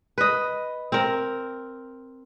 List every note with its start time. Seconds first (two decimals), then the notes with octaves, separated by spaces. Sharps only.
0.18 B4 D#5
0.92 C4 A#4